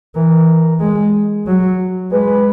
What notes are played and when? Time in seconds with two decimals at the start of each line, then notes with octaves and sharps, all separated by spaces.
0.15 E3 A#4
0.80 G#3
1.46 F#3
2.11 G#3 B4